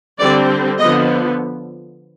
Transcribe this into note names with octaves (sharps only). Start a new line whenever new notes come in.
D3 G3 C4 D5
D3 F3 B3 D#5